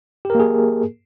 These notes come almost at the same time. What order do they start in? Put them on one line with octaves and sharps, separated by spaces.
G4 A#4 A#3 G#4